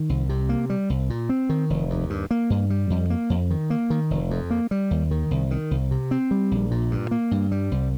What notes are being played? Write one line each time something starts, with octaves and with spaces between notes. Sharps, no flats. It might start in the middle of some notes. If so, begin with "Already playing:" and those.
Already playing: D#3
C2
C3
A#3
G3
C2
A#2
C4
D#3
F1
D#2
G2
A#3
G2
G3
F2
A#3
F2
D#3
A#3
D#3
F1
F2
A#3
G3
D#2
D#3
C2
D#3
C2
C3
C4
G3
A#1
A#2
G2
A#3
G2
G3
C2